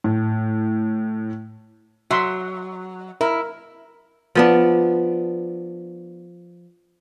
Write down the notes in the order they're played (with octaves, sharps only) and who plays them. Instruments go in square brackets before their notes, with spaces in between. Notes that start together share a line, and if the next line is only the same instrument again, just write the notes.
[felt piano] A2
[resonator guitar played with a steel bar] F#3 [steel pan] E5 C6
[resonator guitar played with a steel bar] E4 [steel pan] A#4
[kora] F3 B3 D4